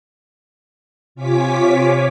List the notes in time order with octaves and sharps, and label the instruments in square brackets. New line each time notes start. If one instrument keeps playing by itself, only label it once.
[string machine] C3 F4 C#5 G#5 D6 B6